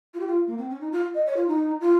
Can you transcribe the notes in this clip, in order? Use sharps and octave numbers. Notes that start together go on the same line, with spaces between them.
F4
G4
F4
A#3
C4
C#4
D#4
F4
D#5
C#5
F4
D#4
F4